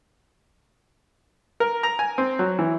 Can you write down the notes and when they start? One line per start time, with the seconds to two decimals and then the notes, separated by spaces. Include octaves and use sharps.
1.60 A#4
1.83 A#5
1.99 G#5
2.18 C4
2.39 F#3
2.59 E3